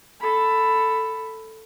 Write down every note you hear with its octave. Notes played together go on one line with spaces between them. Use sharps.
A4 B5